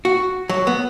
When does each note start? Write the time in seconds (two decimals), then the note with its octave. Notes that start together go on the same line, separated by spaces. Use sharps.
0.05 F#4
0.49 F#3
0.67 B3